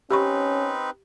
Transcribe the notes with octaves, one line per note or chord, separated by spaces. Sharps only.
C4 C#4 D#4 G4 B4 B5 C#6